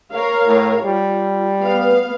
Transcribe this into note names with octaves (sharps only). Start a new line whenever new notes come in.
A#4 C#5 F5
A2
G3 F4
B3 F5